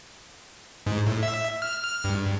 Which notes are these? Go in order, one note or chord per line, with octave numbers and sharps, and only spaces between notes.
G#2
A2
E5
F6
G2